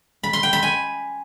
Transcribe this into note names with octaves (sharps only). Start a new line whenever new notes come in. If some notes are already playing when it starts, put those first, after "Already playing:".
B5
C6
G5
B5
G#5